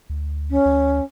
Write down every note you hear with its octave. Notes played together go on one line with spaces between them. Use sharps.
D2
C#4
D2